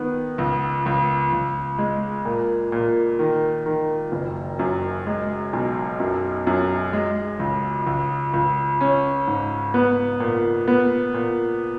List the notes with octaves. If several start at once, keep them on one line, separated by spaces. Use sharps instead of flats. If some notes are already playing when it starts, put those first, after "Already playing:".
Already playing: D#3 B3
C#2
C#2
C#2
G#3
A#2
A#2
D#3
D#3
F#1
F#2
G#3
B1
F#2
F#2
G#3
C#2
C#2
C#2
C#4
G#2
B3
A#2
B3
A#2